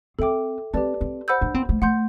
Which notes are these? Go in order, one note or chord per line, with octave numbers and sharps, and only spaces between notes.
C4 A4 E5 G5 D6
C4 G4 B4 D5 A5
C4
C5 F#5 B5 E6 G6
D4
C4
A3
A3 F#5 C6 G6